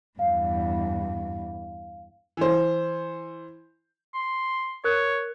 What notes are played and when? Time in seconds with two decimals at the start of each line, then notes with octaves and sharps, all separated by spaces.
0.19 E2 G2 F5
2.37 E3 C5
4.14 C6
4.84 A#4 C#5 F#6